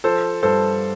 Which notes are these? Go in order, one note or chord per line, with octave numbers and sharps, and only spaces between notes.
F3 A4 C5
G2 A4 C5